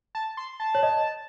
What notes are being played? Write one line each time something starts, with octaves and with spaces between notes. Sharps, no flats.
A5
C6
A5
C#5
D#5